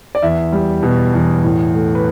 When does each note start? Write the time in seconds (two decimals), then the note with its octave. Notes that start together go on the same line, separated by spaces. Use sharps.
0.15 D5
0.23 E2 E5
0.52 G3
0.83 B2
1.14 E2
1.43 A2
1.74 A3
1.95 B4